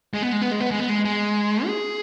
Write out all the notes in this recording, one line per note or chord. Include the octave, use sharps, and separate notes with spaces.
G#3
B3
G#3
B3
G#3
B3
G#3
B3
G#3
G#3
G#4